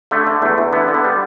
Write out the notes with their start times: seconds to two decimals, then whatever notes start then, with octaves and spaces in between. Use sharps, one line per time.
0.11 D3 A3
0.27 D3
0.42 E2 A3
0.58 E2
0.73 D3 B3
0.88 D3
0.94 B3
1.04 G3